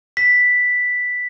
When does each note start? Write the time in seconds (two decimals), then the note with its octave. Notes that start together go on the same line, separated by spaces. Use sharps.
0.17 B6